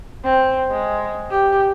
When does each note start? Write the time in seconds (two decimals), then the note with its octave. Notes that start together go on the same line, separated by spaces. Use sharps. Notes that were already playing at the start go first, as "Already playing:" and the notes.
0.25 C4
0.71 G#3
1.31 G4